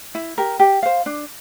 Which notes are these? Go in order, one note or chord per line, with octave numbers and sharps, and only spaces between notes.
E4
G4 A#4
G4
C5 F5
D4